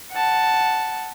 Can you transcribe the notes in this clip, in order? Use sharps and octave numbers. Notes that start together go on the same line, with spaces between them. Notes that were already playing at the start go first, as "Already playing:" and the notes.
F#5 A5